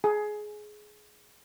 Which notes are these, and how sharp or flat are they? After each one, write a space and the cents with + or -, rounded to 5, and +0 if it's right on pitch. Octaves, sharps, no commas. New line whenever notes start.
G#4 +15